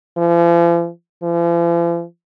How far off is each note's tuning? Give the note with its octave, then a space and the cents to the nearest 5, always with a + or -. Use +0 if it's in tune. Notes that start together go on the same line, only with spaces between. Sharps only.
F3 -45
F3 -45